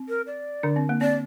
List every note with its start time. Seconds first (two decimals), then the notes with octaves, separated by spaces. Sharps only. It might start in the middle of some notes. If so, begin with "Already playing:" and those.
Already playing: C4
0.09 A#4
0.27 D5
0.63 D3 D4
0.76 C4
0.89 A#3
1.01 C4 D5